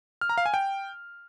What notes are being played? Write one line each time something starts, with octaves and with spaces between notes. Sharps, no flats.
F6
A#5
F5
G#5
G5